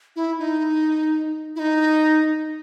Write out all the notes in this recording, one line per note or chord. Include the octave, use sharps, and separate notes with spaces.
E4
D#4
E4
D#4